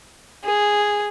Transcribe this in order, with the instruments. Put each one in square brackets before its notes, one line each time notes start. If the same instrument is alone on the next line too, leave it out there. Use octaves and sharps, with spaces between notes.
[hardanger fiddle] G#4